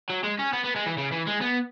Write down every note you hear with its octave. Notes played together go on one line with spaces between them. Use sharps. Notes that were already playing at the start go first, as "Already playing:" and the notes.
F#3
G#3
C#4
B3
B3
G#3
E3
C#3
E3
G#3
B3